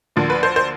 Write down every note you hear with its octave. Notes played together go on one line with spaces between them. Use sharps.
D2 D3 F3 A#3
B4
C5
C5